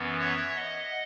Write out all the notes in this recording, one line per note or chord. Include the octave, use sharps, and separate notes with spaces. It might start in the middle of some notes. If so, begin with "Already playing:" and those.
Already playing: F#2 E3 B3
C#5 E5
D#5 F#5